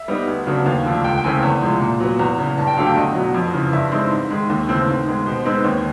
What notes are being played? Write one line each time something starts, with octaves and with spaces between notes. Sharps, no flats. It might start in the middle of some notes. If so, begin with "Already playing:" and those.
Already playing: E5
G3 B3 D#4
D2
C#3 F#3 B3 D4
D#2 F5
D3 F3 A3 D4
C#2 G5
G5
C#3 E3 A3 C4 G#5
E2
C3 F3 G#3
A#2
F#3 B3
E2 A#5
C#3 E3
G2 A5
G5
D3 F#3 A3 D4 F5
G5
E2 D#5
B2 F#3
F2
C#3 E3
G2 E5
E3 G#3 C4 D#4
G#2
D#3 G#3
D#2
C#3 E3 A3 C4
G#2
D#3 G#3 B3
B2 C5
G#3 C4 D#4 B4
D#2 C#5